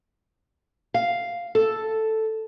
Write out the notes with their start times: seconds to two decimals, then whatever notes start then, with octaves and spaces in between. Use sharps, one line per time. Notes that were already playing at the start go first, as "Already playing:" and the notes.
0.94 F5
1.55 A4